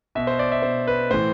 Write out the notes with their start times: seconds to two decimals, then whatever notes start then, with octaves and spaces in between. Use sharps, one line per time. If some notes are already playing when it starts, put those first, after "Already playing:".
0.15 B2 E5
0.27 C5
0.39 D5
0.52 E5
0.62 B2 C5
0.87 B4
1.11 A2 E3 C5